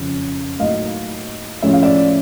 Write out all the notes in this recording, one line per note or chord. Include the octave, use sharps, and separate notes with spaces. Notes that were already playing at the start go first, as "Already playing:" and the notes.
Already playing: F2 C#3 F3
A2 F#3 A#3 D#4 D#5 F5
A2 F3 G#3 C#4 E5
F5
D5 E5